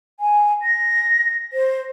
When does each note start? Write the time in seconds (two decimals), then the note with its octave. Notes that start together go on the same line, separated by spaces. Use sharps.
0.20 G#5
0.63 A#6
1.53 C5